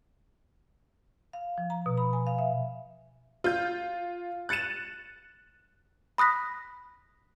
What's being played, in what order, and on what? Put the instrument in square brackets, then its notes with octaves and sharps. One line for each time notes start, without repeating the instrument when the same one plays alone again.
[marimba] F5
F3
A#5
B2
B5
G#5
F5
E5
[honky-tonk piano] F4 G6
F#6 A6 C#7 D#7 E7
[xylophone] B5 D#6 F#6 A#6 B6